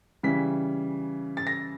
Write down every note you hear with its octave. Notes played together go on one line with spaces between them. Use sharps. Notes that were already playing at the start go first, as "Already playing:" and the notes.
C#3 E3 G3 B6
A6
A#6